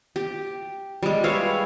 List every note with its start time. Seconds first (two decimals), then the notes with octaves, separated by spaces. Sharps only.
0.16 G4
1.03 G3 G#3
1.24 B4 C#5 E5 F5